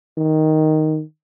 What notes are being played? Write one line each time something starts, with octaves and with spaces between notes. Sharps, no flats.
D#3